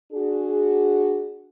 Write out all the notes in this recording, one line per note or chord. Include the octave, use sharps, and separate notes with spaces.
D4 F#4 G#4